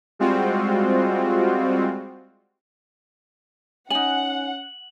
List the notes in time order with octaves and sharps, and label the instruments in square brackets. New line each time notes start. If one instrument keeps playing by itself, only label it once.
[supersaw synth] G3 G#3 C4 F4 F#4
[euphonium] C#4 [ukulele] D#4 G#5 [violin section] F#5 [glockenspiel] F#7